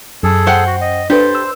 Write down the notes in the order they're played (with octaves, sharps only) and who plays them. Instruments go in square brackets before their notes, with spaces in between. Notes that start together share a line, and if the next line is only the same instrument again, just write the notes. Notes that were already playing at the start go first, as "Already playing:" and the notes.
[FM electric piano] F#2 [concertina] G#4 A4
[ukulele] C5 F#5 G5
[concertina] F#4
D#5
[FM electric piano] D4 B4 [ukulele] G4 A4 [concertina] C5
[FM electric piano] E6